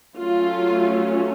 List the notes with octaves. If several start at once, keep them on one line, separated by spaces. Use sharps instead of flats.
F#3 A3 C#4 F4